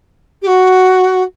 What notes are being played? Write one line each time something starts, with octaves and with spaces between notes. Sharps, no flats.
G4
F#4